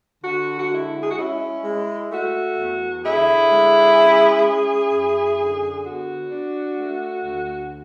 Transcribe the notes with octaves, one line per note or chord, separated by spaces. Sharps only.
D3 F#4
F#4
G#3 E4
G#4
F#4
C#4 E4
G#3
A3 F#4
E2
D3 E4 G#4
G#3
C#4
E4
F#2
D3
B3 F#4
D4
A3
D2